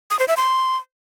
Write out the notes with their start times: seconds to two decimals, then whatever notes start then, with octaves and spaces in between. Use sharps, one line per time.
0.10 D#6
0.19 C5
0.28 E5
0.37 C6